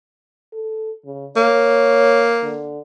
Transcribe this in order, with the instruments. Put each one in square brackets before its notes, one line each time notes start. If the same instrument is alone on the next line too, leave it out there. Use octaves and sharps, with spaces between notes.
[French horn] A4
C#3
[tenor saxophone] A#3 [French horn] C#5
[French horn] D3